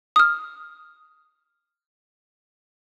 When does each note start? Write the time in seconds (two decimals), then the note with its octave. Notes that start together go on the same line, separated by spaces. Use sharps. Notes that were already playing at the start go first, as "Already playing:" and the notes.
0.16 D#6 F6